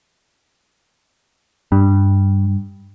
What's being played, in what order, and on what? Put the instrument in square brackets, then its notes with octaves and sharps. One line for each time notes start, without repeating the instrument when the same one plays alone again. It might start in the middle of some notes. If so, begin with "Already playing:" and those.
[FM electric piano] G2 [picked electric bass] G3